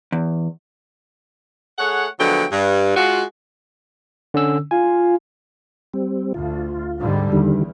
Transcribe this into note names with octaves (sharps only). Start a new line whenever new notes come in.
E2
A3 G#4 C#5 F#5
D3 F3 F#3 G#3 B3 G5
G2
G#3 F4 F#4
D3 C#4 E6
F4 G#5
G3 C4
D2 F4
G#2 D3 G3
E2 D3 D#3 G3